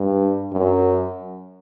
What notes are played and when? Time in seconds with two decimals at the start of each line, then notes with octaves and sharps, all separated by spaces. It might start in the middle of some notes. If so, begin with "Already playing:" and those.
Already playing: G2
0.53 F#2